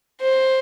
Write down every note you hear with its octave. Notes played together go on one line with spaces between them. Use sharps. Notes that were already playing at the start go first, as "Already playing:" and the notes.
C5